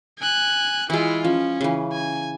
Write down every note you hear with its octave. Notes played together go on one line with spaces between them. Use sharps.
G#5 F#6
E3 G#3 E4 F4
F3 C#4
C#3 E3
G#5